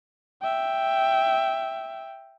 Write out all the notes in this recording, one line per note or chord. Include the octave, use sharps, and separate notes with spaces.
E5 G5